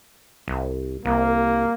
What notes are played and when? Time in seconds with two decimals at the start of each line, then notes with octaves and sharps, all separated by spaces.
0.48 C2
1.05 C2 A#3